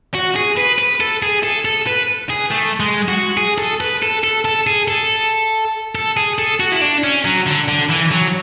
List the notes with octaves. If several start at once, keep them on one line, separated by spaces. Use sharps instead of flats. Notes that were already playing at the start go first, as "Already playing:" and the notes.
F#4
G#4
B4
B4
A4
G#4
A4
A4
B4
G#4
A3
G#3
F#4
G#4
A4
B4
A4
A4
A4
G#4
A4
A4
G#4
A4
F#4
E4
D4
C#4
F#3
D3
D3
E3
F#3